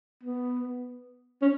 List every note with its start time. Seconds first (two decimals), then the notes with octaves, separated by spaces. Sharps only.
0.23 B3
1.42 C#4